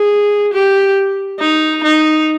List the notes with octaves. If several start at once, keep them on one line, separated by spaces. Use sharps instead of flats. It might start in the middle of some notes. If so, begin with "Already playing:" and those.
Already playing: G#4
G4
D#4
D#4